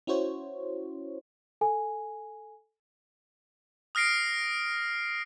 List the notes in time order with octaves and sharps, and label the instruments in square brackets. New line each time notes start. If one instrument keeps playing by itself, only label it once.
[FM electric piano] C#4 E4 F#4 C5 C#5
[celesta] A4 G#5
[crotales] D#6 F6 A#6 C7 D7